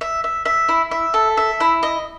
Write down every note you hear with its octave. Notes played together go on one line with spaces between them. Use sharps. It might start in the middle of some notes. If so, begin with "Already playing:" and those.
E5
E5
E5
E4
E5
A4
E5
E4
D#5